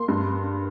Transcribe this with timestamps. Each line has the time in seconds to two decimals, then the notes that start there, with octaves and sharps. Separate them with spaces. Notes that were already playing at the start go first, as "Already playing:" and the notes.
Already playing: A#3 C6
0.08 G2